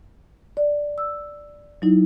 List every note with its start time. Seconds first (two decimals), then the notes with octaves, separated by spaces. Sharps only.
0.57 D5
0.98 E6
1.82 F#3 D#4 E4